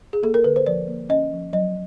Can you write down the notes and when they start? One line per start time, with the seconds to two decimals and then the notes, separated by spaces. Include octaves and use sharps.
0.13 G#4
0.23 A#3 A4
0.34 A#4
0.44 D3 B4
0.56 C5
0.66 F3 D5
0.88 A#3
1.09 C#4 D#5
1.32 F3
1.53 F#3 D#5